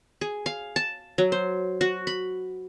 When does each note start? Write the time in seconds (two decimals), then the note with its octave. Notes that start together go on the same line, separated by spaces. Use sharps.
0.21 G#4
0.46 F5
0.76 A5
1.18 F#3
1.32 C5
1.81 F#4
2.07 B5